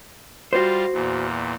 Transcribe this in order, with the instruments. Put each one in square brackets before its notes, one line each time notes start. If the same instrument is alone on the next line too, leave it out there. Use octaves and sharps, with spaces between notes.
[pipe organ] G3 F4 [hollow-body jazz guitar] F#4 C5
[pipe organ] E2 A#2